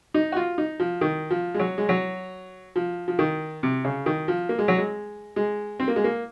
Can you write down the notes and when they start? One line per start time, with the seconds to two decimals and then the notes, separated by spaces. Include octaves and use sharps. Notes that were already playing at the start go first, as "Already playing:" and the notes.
0.14 D#4
0.32 F#4
0.36 F4
0.58 D#4
0.80 F3
1.01 D#3
1.30 F3
1.55 G#3
1.59 F#3
1.78 G#3
1.89 F#3
2.76 F3
3.08 F3
3.19 D#3
3.63 C3
3.85 C#3
4.06 D#3
4.28 F3
4.49 A#3
4.59 G#3
4.68 F#3
4.78 G#3
5.36 G#3
5.80 C4
5.88 A#3
5.96 G#3
6.04 A#3